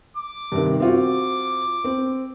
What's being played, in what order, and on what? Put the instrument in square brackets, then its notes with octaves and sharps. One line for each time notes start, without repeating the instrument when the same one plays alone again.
[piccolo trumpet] D6
[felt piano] G2 C3 D#3
[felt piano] C4 F4 F#4 [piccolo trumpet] D6
[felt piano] C4